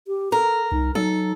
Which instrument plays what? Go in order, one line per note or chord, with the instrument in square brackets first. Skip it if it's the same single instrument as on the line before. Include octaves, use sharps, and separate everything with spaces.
[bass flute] G4
[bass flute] A4 [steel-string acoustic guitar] A#4
[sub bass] C2 [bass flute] D#4
[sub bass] F#3 [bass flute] D#4 [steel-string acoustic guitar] A4